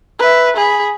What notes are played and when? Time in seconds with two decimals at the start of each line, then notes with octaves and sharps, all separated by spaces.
0.19 B4 E5
0.56 G#4 B5